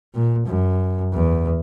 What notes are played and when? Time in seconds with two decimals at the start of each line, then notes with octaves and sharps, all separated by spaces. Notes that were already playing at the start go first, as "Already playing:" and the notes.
0.14 A#2
0.46 F#2
1.13 E2